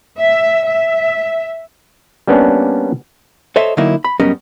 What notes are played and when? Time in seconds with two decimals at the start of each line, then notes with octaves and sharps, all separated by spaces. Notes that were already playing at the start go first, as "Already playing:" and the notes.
0.19 E5
0.67 E5
2.27 G3 A#3 B3 C#4 D4
3.56 A4 C5 C#5 D#5 E5
3.77 D3 F#3 A#3 D#4 E4
4.04 B5
4.20 F#2 G3 B3 C#4 A#4 D#5